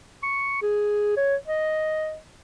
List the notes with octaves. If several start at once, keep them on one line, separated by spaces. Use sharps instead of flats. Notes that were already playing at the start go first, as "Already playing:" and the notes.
C#6
G#4
C#5
D#5